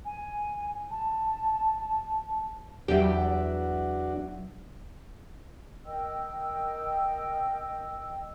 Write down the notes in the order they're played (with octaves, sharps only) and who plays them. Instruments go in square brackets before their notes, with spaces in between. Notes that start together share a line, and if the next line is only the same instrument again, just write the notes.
[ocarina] G#5
A5
[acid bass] E2 [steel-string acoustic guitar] F#3 D5 E5 [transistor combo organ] D4 F#4 [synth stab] G4 G5
[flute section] A#4 D#5 G5 E6